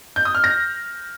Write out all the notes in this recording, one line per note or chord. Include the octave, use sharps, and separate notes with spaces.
G6
D#6
F6
A#6